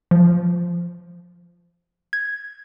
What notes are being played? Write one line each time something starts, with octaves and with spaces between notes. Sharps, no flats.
F3
G#6